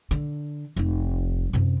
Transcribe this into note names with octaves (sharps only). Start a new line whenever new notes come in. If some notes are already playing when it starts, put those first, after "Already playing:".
D3
F1 D#4
F#2 C3